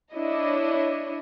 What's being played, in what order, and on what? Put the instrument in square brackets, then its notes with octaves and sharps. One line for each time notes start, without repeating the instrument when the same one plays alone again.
[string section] D4 E4 C#5 D#5